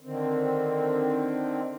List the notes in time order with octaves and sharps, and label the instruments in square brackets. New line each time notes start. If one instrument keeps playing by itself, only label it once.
[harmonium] D3 D#3 C4